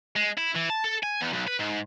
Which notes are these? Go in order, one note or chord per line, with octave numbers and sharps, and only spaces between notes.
G#3
E4
E3
A5
A4
G#5
E2
B1
B4
G#2